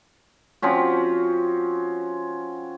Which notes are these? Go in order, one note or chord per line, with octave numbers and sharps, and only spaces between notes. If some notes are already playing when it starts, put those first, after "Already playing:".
F3 C4 C#4 F#4